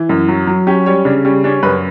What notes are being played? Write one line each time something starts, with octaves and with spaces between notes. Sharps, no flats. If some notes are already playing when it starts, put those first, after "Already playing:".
Already playing: E3
F#2
F#3
F#3
C#4 G4
G3 C#5
C#3 D4
G3 C#4
C#4 D4
F#2 B4